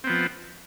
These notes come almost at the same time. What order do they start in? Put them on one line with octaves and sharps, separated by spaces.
C4 B3 F3